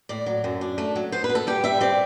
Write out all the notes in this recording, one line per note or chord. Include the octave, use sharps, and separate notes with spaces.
A2 D5
F#3
F#2
D4
A3
F#3
B3 C5
B4
B3
A4
G3 G4
G3 E5
C4 D5